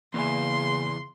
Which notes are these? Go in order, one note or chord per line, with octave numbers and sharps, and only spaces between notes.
E2 C#3 A#3 D5 G#5 C6